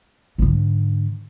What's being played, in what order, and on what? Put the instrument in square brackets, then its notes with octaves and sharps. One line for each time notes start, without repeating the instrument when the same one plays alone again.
[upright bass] G#2 D3